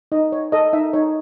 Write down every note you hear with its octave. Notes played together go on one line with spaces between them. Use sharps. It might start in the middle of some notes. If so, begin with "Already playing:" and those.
D#4 D#5
C#5
A4 D#5
D#4 E5
D#4 C#5